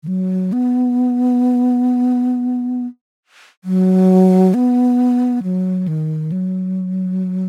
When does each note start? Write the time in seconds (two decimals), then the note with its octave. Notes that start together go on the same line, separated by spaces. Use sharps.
0.03 D#3
0.08 F#3
0.52 B3
3.64 F#3
4.54 B3
5.43 F#3
5.88 D#3
6.32 F#3